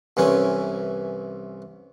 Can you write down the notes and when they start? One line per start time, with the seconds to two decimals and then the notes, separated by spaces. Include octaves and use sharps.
0.17 C2 E3 C#4 G#5